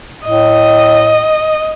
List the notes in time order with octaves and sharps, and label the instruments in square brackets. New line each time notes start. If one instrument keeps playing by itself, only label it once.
[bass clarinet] A2 [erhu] D#5